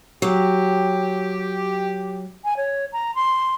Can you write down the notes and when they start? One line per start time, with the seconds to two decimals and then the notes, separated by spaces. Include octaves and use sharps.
0.22 F#3 G4
2.45 G#5
2.57 C#5
2.93 A#5
3.15 C6